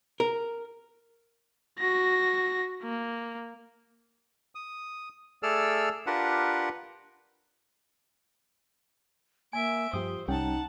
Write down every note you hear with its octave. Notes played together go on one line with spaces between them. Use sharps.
A#4
F#4 A#6
A#3
D#6
A3 G#4 A4 D5 E6 F6
D4 F4 G4 A#4 B4 F#5
A#3 E5 G#5 D7
G2 F3 G4 C5 D#6
C2 G3 C#4 D#4 F#5 G5 A5